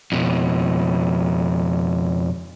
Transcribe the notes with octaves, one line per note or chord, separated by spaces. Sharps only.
F2 B2